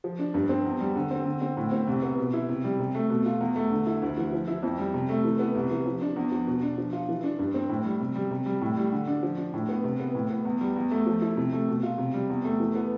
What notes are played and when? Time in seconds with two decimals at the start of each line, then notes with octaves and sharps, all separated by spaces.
0.04 F3
0.19 D4
0.34 G2
0.49 C4
0.65 E2
0.80 G3
0.96 D3
1.11 C4
1.26 D3
1.42 C4
1.57 A2
1.72 C4
1.87 C2
2.02 B3
2.18 B2
2.33 E4
2.49 C3
2.64 G3
2.79 C3
2.95 A3
3.10 B2
3.26 F4
3.41 E2
3.56 A3
3.72 D3
3.86 E4
4.02 D2
4.17 E3
4.32 F3
4.48 E4
4.63 F2
4.78 G3
4.94 C3
5.09 A3
5.24 E3
5.39 B3
5.55 C2
5.70 E3
5.86 F3
6.01 D4
6.16 E2
6.32 F3
6.47 B2
6.63 D4
6.78 F3
6.93 F4
7.09 E3
7.23 D4
7.39 G2
7.54 C4
7.69 A2
7.85 G3
8.00 C3
8.15 G3
8.31 C3
8.46 G3
8.61 A2
8.77 G3
8.92 D3
9.07 D4
9.23 F3
9.38 D4
9.54 A2
9.69 B3
9.84 C3
10.00 B3
10.15 A2
10.30 B3
10.45 E2
10.61 G3
10.76 E2
10.91 A3
11.06 F3
11.22 E4
11.37 C3
11.53 A3
11.68 B2
11.83 F4
11.98 C3
12.14 G3
12.29 E2
12.44 A3
12.60 E3
12.75 B3